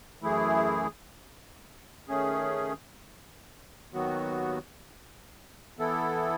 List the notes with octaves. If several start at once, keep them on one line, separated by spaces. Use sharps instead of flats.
F#2 E3 A3 E4 G#4
D#3 A3 C#4 G#4
D#2 D#3 F#3 B3 F#4
E3 B3 E4 A4